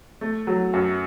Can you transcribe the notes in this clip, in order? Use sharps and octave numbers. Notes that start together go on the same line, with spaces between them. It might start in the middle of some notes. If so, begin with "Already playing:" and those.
A3
F#3
F#2